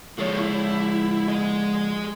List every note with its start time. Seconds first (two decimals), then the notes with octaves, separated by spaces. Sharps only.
0.19 F3 G#3 A4 C#5
0.39 E4
1.28 G#4 D#5